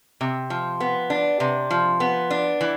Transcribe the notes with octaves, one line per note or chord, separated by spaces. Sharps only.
C3
F3
B3
D4
C3
F3
B3
D4
E3